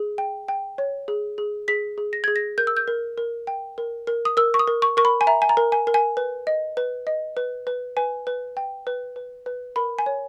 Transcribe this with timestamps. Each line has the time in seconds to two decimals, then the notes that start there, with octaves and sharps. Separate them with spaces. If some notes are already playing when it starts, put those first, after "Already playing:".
Already playing: G#4
0.18 G5
0.48 G5
0.78 C#5
1.08 G#4
1.38 G#4
1.68 G#4 B6
1.98 G#4
2.13 A#6
2.24 G#4 G#6
2.36 A#6
2.58 A#4 G6
2.67 E6
2.77 G6
2.88 A#4
3.18 A#4
3.47 G5
3.78 A#4
4.07 A#4
4.25 D#6
4.37 A#4 E6
4.54 C#6
4.59 D#6
4.67 A#4
4.82 C#6
4.97 A#4 C#6
5.05 B5
5.21 G#5
5.27 E5 A#5
5.42 G#5
5.49 A#5
5.57 A#4
5.72 G#5
5.87 A#4
5.94 G#5
6.17 B4
6.47 D#5
6.77 B4
7.07 D#5
7.37 B4
7.67 B4
7.97 B4 G#5
8.27 B4
8.57 G5
8.87 B4
9.16 B4
9.46 B4
9.76 A#4 B5
9.99 G#5
10.06 C#5